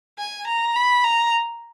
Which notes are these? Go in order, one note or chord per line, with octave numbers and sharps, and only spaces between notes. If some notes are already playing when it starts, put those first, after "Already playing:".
G#5
A#5
B5
A#5